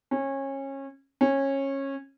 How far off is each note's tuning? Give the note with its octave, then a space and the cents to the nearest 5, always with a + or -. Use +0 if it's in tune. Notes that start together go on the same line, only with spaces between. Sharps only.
C#4 -25
C#4 -20